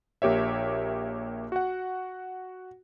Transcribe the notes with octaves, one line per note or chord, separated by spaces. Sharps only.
A#1 A#3 G4 C#5 E5
F#4 F#5